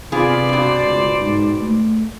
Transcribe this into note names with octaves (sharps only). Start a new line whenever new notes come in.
C3 B3 F4 G#4 C5 D5
G2 B2
C#2
G#2
A3